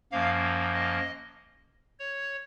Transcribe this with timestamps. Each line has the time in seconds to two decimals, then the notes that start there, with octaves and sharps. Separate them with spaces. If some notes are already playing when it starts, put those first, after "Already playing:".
0.12 F#2 F3 A#3 F5
0.74 D#5
1.99 C#5